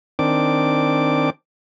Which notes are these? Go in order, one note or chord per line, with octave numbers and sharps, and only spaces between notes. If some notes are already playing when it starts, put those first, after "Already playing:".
D#3 C4 D4 D6